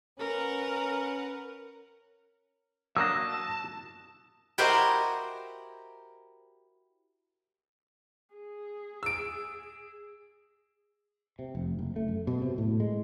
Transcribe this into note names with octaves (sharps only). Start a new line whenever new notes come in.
C#4 A#4 B4 F#5
F#3 A#3 D4 A5 D#6 E6 F#6 A#6
E4 F#4 G4 A#4 C5 D#5
G#4
E6 D7
C3
F1
F#1
A3
F#2
B2
C3
A2
G#3